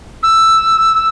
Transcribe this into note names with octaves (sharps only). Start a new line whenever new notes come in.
E6